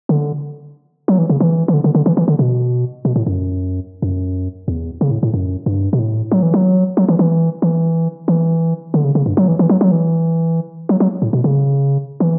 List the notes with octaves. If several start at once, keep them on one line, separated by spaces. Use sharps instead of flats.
D3
F#3
E3
C#3
E3
E3
D3
D3
D3
E3
E3
D3
B2
B2
A2
F#2
F#2
E2
C#3
A2
A2
F#2
G2
B2
A2
F#3
E3
F#3
F#3
E3
E3
E3
E3
D3
C#3
C#3
G2
F#3
E3
E3
F#3
F#3
E3
F#3
F#3
A2
B2
C#3
E3